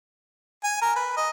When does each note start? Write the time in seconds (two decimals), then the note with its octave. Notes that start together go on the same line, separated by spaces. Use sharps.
0.64 G#5
0.81 A#4
0.96 B4
1.17 D#5